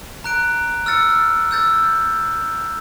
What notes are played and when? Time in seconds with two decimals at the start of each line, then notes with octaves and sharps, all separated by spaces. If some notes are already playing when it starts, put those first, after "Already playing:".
0.24 A#5 F#6 D7
0.86 E6 F6 A6 C#7
1.51 E6 G6 A6